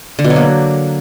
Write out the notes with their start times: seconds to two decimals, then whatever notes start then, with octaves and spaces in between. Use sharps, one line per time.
0.19 D3
0.24 B2
0.30 F#3
0.36 A#3